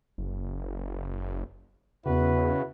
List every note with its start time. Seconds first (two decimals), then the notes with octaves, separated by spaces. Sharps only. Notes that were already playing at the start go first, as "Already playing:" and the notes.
0.18 F#1
2.06 E2 C#3 E4 F#4 B4